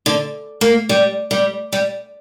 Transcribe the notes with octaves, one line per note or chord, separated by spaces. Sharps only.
D3
A#3
G3
G3
G3